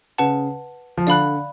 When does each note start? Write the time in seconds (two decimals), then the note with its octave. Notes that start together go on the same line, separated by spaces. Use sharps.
0.18 C#3 B4 F#5 A5
0.98 F3
1.07 D3 D5 F5 B5 F#6